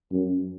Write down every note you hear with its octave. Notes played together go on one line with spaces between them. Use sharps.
F#2